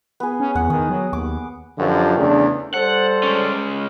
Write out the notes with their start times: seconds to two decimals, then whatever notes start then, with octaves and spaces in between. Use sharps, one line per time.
0.20 B3 G#4
0.40 C#4
0.55 E2 F#5
0.70 D#3 D#6
0.89 F#3
1.13 D#2 D6
1.78 F#2 D3 F3 F4 G4 B4
2.17 E2 C#3 A3 D4
2.74 G3 A4 C5 F#5
3.23 G#3 C#4